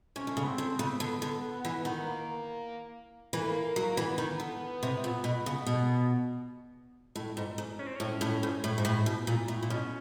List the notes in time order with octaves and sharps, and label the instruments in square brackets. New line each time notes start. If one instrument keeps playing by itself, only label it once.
[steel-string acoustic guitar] C3 [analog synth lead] C#4
[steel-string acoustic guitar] D3
C#3
[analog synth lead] B3
C4
[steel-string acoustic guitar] D3
[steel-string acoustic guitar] C#3 [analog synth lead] B3
[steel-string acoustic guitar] D3
D3
E3
D#3
[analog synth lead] A#3
[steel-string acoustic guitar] E3 [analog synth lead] A#3
[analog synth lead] A3
A#3
[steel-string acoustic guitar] F#3
[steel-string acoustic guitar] E3 [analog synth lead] B3
[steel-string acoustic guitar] D#3
D3
C3
A#2
B2
C#3
B2
A2
G#2
G#2
[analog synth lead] C#4
C4
[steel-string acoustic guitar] A2 [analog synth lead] C#4
[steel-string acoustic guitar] A2
G#2
A2
G#2
A2
B2
A#2
A2
A#2
[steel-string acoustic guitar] B2 [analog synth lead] C#4